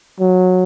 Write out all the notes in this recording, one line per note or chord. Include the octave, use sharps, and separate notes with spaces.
F#3